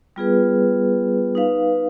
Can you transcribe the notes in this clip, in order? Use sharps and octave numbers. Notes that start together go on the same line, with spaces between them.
G3 B3 F4 G#4 B4
D#4 B4 F5